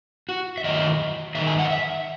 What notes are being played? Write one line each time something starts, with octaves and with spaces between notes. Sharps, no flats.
F#4
E5
D#3 F#3 A3 D#5
D#3 G#3 D#4 E5
G#5
F#5
D#5
E5